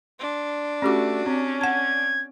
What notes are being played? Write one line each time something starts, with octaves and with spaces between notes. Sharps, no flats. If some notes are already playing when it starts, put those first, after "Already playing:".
D4 C6
A3 C#4 F#4 G4 D6
C4 C#4
F#5 A5 G#6